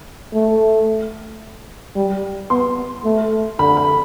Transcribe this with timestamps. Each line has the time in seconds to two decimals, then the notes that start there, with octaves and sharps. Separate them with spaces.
0.33 A3
1.95 G3
2.50 B3 C6
3.05 A3
3.59 D3 B5
3.77 B5